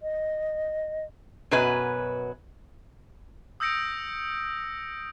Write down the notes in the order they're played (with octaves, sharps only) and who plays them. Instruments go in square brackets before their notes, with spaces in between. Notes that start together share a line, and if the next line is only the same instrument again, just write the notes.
[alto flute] D#5
[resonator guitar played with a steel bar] F#2 B2 F#3 B4 G#5
[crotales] D#6 E6 G6 A#6 C#7 D7